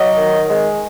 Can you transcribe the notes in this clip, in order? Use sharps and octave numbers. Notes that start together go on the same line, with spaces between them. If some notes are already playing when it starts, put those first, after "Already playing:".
Already playing: F#3 D#5
D#3
G#3